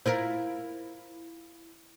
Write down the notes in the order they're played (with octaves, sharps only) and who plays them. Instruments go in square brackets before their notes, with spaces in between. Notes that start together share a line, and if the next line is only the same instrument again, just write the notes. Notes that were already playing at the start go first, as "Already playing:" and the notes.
[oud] E4 F4 A#4 [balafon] C5